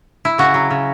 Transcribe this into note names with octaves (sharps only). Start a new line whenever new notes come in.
E4
C#3 F#4
F#3
C#3